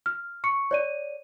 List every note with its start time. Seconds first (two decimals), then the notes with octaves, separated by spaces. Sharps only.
0.06 F6
0.44 C#6 C#7
0.71 C#5 D5 D#7